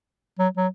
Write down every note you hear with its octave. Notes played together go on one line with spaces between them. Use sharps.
F#3
F#3